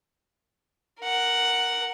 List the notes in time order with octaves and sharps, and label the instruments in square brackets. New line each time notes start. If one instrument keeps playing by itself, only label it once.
[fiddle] A#4 F#5